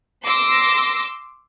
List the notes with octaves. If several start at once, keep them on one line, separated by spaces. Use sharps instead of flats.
C6 D6 E6 A#6